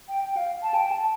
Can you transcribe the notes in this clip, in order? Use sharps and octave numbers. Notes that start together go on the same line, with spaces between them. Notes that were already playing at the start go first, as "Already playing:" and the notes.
G5
G5
F5
A5
G5
A5